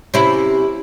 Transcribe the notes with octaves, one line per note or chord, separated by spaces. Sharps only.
C3 C#4 E4